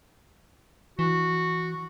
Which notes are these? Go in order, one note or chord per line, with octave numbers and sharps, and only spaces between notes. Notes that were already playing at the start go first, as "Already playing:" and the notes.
E3 F#4